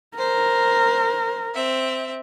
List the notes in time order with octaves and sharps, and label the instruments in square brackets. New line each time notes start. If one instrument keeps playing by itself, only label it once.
[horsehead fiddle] A#4 [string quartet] C5
[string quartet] C4 E5